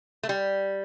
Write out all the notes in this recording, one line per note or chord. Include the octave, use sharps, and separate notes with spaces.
A3
G3